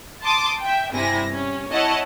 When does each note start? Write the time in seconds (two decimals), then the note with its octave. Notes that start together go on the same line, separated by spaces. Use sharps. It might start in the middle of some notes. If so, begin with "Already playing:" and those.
0.24 A5 C6 D6 D#6
0.61 E5 G5
0.93 G2 C3 E4 G#5 A#6
1.32 C#4
1.72 E4 C#5 D#5 F#5 A5